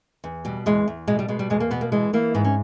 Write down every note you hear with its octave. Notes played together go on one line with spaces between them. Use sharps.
E2
B2 G3
E2 G#3
E2
B2 G#3
G3
B2 G#3
G3
E2 G#3
A#3
B2 B3
A#3
E3 G#3
E3 A#3
G#2 B3
C#4